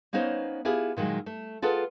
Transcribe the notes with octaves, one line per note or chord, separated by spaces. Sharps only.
A#3 B3 C#4 D#4 C5 C#5
B3 E4 F4 G4 G#4
A#2 D#3 F#3 G#3
A3
F4 G#4 A4 B4 F#5